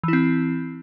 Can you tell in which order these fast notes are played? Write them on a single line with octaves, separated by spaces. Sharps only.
E3 E4 C4